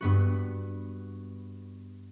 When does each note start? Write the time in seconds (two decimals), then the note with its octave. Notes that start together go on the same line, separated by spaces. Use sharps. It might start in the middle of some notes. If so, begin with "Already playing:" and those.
0.01 G2 B3 F#4